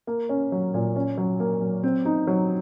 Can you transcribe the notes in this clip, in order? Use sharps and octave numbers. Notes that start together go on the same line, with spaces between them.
A#3
C#4
F#3
A#2
C#4
F#3
A#3
F#3
C4
D#4
F#3